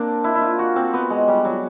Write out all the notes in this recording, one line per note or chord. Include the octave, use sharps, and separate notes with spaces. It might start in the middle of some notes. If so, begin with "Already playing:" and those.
Already playing: A#3 C4 D4
E4
E4
F4
F#4
C4
B3
G#3
G3
F#3